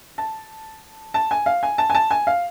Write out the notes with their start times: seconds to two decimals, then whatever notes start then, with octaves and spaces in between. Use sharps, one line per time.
0.18 A5
1.14 A5
1.31 G#5
1.46 F5
1.63 G#5
1.78 A5
1.90 G#5
1.95 A5
2.11 G#5
2.27 F5